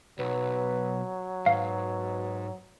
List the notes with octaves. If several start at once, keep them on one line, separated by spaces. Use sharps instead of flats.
B1 F#3 B4
G#2 B2 F5